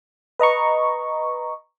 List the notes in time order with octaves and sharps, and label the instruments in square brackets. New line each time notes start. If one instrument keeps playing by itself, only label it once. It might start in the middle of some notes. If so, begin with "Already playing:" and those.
[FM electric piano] B4 D#5 A#5 C#6